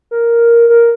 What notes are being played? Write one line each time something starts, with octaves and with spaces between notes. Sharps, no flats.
A#4
A#4